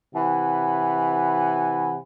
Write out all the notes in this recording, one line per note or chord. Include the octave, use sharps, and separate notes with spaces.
C3 E3 F#5 G#5 B5